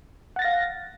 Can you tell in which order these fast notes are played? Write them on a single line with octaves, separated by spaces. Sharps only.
F#5 A6 A#6 F5